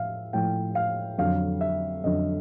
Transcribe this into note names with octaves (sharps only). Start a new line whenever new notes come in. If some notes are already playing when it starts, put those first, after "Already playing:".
Already playing: A2 F3 E5 F5
A2 F3 G5
F5
F2 D3 F#3 F5
E5
F2 D3 F#3 D#5